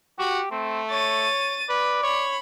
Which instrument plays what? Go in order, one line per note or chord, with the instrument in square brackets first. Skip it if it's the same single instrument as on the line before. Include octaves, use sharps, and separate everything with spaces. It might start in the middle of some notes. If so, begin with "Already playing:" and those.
[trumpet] F#4 [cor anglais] G4
[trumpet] A3 [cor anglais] C4
[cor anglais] C#5 [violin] A6 D#7
[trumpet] B4 [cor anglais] D5
[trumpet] C#5 [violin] B5